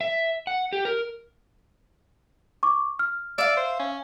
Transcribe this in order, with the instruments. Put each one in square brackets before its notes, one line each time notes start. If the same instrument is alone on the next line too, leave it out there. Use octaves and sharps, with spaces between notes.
[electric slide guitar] E5
F#5
G4
A#4
[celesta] C#6 D6
F6
[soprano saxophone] D5 [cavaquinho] E5 F5
[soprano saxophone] C5
C#4